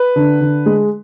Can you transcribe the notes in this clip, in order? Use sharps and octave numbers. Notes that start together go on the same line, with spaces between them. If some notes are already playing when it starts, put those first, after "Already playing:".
Already playing: B4
D3
D3
G#3